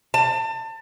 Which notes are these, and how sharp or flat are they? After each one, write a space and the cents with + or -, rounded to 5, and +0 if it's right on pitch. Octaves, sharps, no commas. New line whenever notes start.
A5 +30